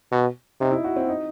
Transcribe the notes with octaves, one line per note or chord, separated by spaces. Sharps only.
B2
C3 D#4
E4
F#4
C4
D#4